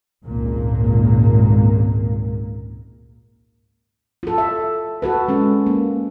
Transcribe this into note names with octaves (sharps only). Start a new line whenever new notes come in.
G#1 C#2 A#2 A#3
F4 A4
E5
F#4 A4 B4
G#3 C#4
A#3